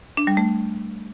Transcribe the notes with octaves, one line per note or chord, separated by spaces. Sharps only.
D4
G3
A3